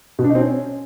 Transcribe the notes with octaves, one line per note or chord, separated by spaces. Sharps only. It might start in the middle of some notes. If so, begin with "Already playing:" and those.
B2
D4
D#4
C4
C#4